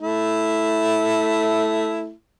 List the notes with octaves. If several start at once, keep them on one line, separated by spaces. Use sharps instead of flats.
A3 E4